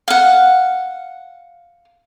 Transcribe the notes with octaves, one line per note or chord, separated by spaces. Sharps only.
F5 F#5